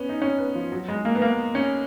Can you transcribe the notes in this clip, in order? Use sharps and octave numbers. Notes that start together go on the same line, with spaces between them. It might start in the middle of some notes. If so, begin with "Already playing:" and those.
Already playing: B3 C#4
D#4
C#4
B3
F3
F#3
G#3
A#3
B3
A#3
C#4